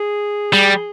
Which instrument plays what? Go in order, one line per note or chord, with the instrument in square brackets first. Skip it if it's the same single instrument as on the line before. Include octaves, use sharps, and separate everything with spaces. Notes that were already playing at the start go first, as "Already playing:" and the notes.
Already playing: [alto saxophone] G#4
[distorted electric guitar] G3